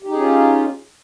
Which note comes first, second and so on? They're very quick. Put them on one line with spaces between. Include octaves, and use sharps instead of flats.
G4 D#4 G#4 C#4 F4